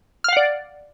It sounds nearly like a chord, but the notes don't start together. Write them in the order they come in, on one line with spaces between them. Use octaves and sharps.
F6 F5 F#5 D5